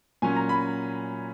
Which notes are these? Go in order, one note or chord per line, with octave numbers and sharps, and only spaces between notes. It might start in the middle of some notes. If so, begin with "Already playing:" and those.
A#2 F#3 C#4 G#5
A#5
B5